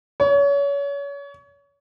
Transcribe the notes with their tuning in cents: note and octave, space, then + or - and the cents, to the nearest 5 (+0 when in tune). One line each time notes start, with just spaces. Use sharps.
C#5 +30